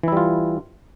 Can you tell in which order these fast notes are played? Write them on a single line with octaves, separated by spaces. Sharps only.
E3 E4 G3 F4